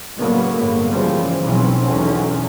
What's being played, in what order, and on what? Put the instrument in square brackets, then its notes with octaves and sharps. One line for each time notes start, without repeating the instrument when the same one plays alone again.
[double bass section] A2 C#3 F#3 G3 A#3 B3
G1 A2 G#3 A#3
C#3 E3 F3 G3 G#3
B1 B2 E3 F#3 C4 C#4
B1 E2 D3 F#3 C#4